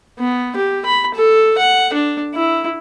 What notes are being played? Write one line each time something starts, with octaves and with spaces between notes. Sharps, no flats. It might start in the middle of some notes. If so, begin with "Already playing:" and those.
B3
G4
B5
A4
F#5
D4
E4